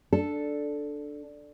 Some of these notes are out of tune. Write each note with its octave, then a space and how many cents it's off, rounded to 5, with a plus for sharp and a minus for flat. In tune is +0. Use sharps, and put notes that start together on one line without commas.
D4 +0 A4 +0